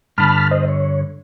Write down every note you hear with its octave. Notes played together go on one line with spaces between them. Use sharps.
G2 D3 A5 B5 F6
C5 D#5
C#5